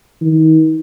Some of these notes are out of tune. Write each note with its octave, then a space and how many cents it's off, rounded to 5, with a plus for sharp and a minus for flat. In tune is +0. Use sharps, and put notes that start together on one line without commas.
D#3 +35